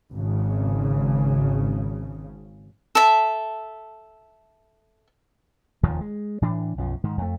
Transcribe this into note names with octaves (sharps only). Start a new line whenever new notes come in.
G#1 C#3
A4 E5
F1 D#2 D#3 F3
G#3
A2 E3 D4
B1 F#2 F3
G#2 D#3
F2 A3